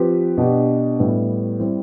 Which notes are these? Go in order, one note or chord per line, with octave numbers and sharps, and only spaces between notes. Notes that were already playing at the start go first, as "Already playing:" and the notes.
Already playing: F3 C4 G4 B4
B2 B3 D4 G4
A2 G3 B3
G3 C4 E4